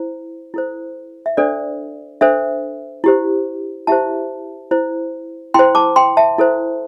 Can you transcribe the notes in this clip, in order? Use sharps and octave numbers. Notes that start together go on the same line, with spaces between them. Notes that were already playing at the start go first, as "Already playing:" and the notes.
Already playing: E4 C5
E4 A4 C5
E5
D4 A4 C5 D5
D4 A4 C5 E5
E4 G4 C5
E4 G4 C5 E5 A5
E4 C5
E4 C5 G5 C6
A5 D6
G5 C6
E5 A5
E4 A4 C5